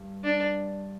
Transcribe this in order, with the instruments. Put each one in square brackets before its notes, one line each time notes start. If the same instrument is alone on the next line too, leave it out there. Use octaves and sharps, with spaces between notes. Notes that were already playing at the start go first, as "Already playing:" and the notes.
Already playing: [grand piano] G2
[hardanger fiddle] D4